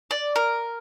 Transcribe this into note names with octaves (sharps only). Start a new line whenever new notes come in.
D5
A#4